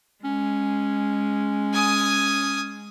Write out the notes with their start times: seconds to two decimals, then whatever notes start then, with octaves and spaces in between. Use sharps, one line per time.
0.24 G#3 C#4
1.73 G#5 D#6